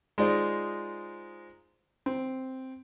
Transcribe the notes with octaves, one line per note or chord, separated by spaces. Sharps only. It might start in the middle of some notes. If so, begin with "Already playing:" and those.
G#3 D#4 F4 C5 D5
C4